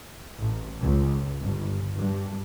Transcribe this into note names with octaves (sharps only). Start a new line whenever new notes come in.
A1
C#2
G1
G2